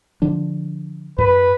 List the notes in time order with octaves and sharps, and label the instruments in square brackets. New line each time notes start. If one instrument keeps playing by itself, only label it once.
[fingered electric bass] D3 F3 D4
[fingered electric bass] F#2 [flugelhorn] B4